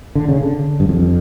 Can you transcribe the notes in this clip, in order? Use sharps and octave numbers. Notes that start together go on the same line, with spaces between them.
D3
C#3
D3
G2
F2